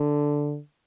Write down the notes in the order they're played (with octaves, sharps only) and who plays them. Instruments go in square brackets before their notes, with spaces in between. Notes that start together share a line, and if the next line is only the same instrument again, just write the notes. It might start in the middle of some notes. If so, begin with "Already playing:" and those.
Already playing: [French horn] D3